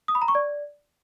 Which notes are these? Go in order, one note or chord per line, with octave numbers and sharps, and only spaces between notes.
D#6
B5
A#5
C#6
D5